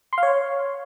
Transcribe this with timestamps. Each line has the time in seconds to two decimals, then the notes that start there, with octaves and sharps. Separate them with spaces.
0.13 C6
0.18 F5
0.23 C#5